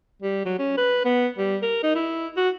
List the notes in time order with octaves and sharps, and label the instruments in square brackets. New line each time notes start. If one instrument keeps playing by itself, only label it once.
[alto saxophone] G3
F#3
C#4
B4
B3
G3
A#4
D#4
E4
F#4